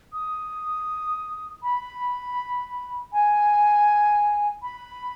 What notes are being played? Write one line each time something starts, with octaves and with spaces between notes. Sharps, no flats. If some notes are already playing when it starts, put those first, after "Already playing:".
D#6
B5
G#5
B5